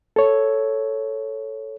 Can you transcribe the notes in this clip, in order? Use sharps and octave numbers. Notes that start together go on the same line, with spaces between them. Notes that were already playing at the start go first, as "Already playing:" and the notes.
A4 C#5